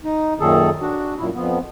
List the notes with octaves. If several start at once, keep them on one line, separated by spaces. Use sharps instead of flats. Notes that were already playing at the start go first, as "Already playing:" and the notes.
D#4
F#2 A#2 D#3 G#4 A4
D4 F#4
F#2 A#2 E4
F2 F3 B3